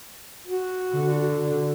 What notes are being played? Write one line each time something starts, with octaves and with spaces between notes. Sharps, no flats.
F#4
D3